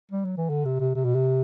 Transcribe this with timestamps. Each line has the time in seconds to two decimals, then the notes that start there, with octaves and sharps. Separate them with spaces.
0.11 G3
0.25 F#3
0.37 E3
0.50 D3
0.65 C3
0.80 C3
0.95 C3
1.04 B2
1.15 C3